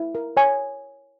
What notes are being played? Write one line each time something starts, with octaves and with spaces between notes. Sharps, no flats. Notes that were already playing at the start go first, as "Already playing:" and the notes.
Already playing: E4
A#4
C#5 G#5